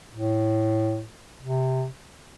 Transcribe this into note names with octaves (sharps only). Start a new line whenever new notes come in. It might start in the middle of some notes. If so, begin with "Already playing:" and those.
A2
C3